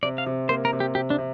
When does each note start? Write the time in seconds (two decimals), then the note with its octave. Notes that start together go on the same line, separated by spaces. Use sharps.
0.03 C3 D5
0.18 F5
0.26 C3
0.49 A#3 C5
0.65 A#4
0.73 C3
0.80 G4
0.95 C3 G4
1.10 D4
1.18 C3